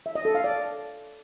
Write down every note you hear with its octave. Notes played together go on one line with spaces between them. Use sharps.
E5
D#5
A4
F5
D5